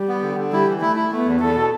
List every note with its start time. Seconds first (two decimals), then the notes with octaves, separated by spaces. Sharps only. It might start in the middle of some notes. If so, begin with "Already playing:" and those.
Already playing: G3
0.08 B3
0.22 D3
0.37 D3
0.52 G3 E4
0.67 E3
0.81 A3 E4
0.96 E4
1.12 A3 B3
1.25 E2
1.41 E2 A4
1.56 B2